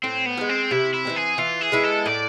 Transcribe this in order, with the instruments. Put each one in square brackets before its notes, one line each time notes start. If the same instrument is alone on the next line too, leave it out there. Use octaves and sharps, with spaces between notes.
[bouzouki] A2 [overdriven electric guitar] C4
[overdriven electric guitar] B3
[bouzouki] F3
G#3
[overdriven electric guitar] C4
[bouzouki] C3 [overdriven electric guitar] E4
[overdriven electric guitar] E4
[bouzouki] E3 G#3 C4
[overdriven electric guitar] G#4
[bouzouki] E3 [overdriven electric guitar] F4
[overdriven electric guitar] G#4
[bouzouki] G#3 B3 E4
[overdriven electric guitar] A4
[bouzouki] A2 [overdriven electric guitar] D5